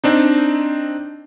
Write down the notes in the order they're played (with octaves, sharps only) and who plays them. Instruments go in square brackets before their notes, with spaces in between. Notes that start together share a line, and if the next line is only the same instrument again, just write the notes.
[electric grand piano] C4 D4 D#4